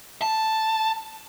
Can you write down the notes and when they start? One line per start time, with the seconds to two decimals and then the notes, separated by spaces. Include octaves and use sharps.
0.22 A5